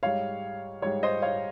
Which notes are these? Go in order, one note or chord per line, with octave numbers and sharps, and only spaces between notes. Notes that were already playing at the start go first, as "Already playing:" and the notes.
G#2 G3 C#5 F5
G#2 G3 C#5
C5 D#5
C#5 F5